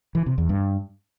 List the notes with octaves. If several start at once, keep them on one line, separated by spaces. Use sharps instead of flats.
E3
C3
E2
G2